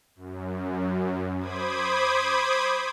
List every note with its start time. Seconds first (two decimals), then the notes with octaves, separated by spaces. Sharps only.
0.16 F#2
1.39 C5 B5 D6 D#6 G#6